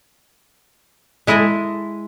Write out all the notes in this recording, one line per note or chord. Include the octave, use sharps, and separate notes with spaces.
G#3 E4 A4 D#5 E5